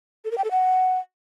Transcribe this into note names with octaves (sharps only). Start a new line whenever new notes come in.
A4
A#4
G5
A4
F#5